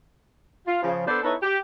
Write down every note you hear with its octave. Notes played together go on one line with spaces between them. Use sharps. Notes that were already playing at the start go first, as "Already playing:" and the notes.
F4
C#3 F3
B3 D4 A4 C5 D5
B3 D#4 E4 A4 B4 C#5
G4